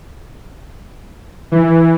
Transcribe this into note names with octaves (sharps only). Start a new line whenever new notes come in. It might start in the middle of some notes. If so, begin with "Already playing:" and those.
E3